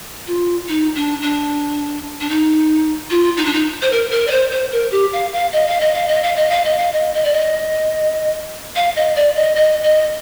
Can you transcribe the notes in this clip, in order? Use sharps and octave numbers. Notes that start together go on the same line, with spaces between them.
F4
D#4
D4
D4
D4
D#4
F4
D#4
D4
D#4
C5
A#4
A#4
D5
C5
C5
A#4
G4
F5
F5
D#5
F5
D#5
F5
D#5
F5
D#5
F5
D#5
F5
D#5
D#5
D5
D#5
F5
D#5
D5
D#5
D#5
D#5